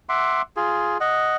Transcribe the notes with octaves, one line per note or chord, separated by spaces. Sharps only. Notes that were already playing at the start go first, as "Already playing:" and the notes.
E5 F#5 C6 D6
F4 G#4
D#5 F#5